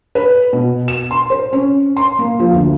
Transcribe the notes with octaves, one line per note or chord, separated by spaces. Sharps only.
B4
B2
E7
C6
C5
C#4
C6
A#3
F3
D2